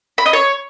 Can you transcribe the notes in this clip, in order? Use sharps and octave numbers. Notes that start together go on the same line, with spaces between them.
B5
D#5
C#5